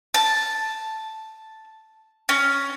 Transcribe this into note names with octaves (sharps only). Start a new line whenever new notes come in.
A5
C#4